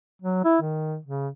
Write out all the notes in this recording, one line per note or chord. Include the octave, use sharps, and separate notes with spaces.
F#3
E4
D#3
C#3